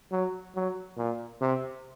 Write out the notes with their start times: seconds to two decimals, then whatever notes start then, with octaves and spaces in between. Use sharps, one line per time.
0.12 F#3
0.55 F#3
0.98 A#2
1.41 C3